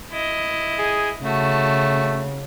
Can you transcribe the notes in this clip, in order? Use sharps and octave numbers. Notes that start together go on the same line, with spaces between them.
E4 D#5
G#4
C#3 A3 F#4 A5